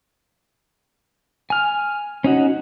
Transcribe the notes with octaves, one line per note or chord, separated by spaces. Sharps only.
G#5 F6
C#4 D#4 F#4